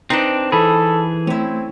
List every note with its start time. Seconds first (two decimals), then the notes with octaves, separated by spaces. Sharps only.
0.10 C4 D4 D#4 B4 C5
0.52 E3 G#4 A4 B5
1.27 A3 C4 C#4 E4